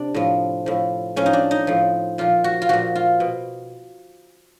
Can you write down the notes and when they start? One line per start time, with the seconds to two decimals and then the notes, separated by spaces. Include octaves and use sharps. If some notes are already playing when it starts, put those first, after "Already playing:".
Already playing: C3 D4
0.14 A2 F3
0.66 A2 F3
1.16 A2 F3 C#4
1.26 D#4
1.33 D4
1.51 D#4
1.67 A2 F3
2.18 A#2 F3 F4
2.44 F#4
2.62 F4
2.69 A#2 F3 F#4
2.95 F4
3.20 B2